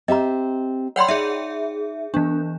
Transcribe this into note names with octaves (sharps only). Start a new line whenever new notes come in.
C4 G4 D#5 E5 A#5
C#5 D5 F#5 G5 B5 C6
D#4 G#4 D5 E5
E3 B3 D4